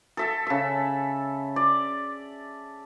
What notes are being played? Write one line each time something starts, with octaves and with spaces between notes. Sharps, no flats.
A4 E5 A5
C#3 E5
D5